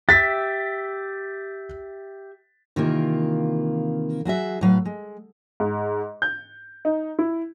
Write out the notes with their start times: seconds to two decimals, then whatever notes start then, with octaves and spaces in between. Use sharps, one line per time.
0.09 G4 E5 A6 B6
2.76 C3 D#3 E3 A#3 F4
4.25 F#3 F#4 G#4 E5
4.61 A2 F#3 B4 F5
4.85 G#3
5.60 G#2
6.22 G6
6.85 D#4
7.19 E4